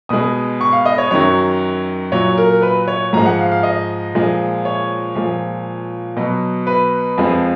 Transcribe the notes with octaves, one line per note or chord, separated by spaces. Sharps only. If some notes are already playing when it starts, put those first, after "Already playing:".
B2 G#3 D#6
C#6
F5
D#5
C#5
F#2 D#3 F#3 C#5
A#2 F#3 C#5
A#4
B4
C#5
G#2 F3 G#3 A#5
F#5
F5
F5
D#5
A#2 F3 G#3
C#5
A#2 F3 G#3
B2 F#3
B4
F2 F3 G#3